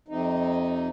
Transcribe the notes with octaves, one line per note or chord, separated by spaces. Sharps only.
F2 C3 D#4